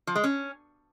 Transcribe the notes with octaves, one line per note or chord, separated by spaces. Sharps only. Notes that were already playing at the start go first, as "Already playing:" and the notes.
F3
G#3
C#4